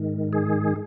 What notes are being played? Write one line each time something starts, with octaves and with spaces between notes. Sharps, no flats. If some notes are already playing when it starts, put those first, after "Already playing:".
Already playing: G#2 D#3
G#4